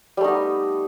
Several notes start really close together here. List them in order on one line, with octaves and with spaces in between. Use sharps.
G3 A3 D#4 B3